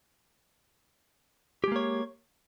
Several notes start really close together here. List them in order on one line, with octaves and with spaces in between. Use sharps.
G4 G#3 A#3 C#5